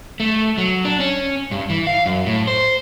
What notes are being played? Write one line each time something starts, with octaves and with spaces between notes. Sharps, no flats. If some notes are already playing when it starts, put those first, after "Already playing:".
A3
F#3
D4
C#4
G2
E3
F5
F#2
A2
C5